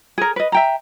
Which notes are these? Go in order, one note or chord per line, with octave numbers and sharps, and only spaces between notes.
G#4 A#4
B4 D#5
E5 G5 A#5